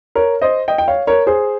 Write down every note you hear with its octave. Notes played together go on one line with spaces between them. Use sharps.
A#4 C#5
C5 D#5
D#5 G5
G5
C#5 F5
A#4 C#5
G#4 C5